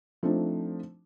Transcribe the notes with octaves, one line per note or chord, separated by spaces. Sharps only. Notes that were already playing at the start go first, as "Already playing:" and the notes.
F3 A3 C4 D4 D#4